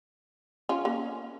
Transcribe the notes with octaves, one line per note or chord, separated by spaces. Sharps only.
C#4 F4
A#3 C#4